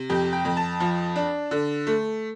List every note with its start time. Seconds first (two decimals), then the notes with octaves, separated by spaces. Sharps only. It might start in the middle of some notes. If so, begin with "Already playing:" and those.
Already playing: C3
0.10 F2 G4
0.33 G5
0.45 F2
0.57 A5
0.80 F3
1.16 D4
1.51 D3
1.87 A3